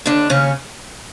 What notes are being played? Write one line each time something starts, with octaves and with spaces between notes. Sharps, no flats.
D#2 D3 D4
D#2 C#3 C#4